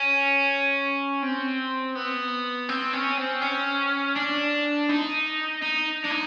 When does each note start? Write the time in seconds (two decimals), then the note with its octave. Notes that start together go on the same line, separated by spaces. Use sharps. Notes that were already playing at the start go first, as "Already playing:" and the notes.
Already playing: C#4
1.22 C4
1.95 B3
2.69 C4
2.93 C#4
3.18 C4
3.41 C#4
4.16 D4
4.89 D#4
5.62 D#4
6.05 D4
6.11 D#4